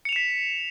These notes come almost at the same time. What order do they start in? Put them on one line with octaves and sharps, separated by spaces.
C#7 F7 E7 B6